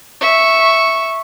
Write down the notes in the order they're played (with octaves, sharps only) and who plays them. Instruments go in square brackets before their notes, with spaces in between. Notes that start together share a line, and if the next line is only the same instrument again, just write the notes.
[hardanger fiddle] E5 C#6